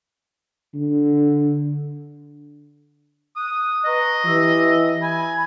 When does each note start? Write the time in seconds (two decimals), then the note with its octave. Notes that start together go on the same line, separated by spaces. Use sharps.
0.74 D3
3.36 D#6 F#6
3.84 B4 D#5 A#5 C#6
4.25 E3 G4 E6
5.02 G#5 B5